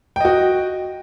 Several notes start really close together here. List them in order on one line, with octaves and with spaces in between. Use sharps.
G5 D#5 F#4